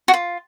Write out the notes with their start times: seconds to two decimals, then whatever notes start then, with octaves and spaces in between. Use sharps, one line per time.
0.08 F#4
0.14 F4